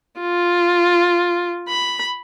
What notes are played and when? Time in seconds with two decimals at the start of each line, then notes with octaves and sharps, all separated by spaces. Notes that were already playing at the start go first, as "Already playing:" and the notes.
0.21 F4
1.69 B5